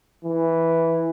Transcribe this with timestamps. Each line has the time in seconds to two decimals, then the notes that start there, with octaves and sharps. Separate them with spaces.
0.25 E3